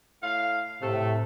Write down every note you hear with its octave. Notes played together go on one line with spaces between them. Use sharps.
A2 F5
A2 C3 A3